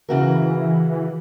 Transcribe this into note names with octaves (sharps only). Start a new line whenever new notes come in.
C#3 E3 F#4 A#4